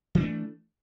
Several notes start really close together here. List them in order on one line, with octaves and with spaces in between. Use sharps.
E3 C4 D4 A3